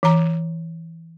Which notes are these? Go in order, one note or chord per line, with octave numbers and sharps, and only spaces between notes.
E3 A#5